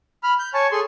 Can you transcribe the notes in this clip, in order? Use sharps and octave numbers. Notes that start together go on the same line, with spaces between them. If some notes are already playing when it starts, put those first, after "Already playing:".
B5 F6
G6
C#5 G#5 A5 C#6
G#4 A4 C6